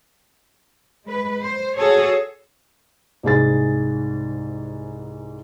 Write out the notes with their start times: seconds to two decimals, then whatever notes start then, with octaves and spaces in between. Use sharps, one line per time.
1.06 G#3 B4
1.43 C5
1.77 F#4 G#4 A4 C#5
3.23 C2 G#2 G#4 A6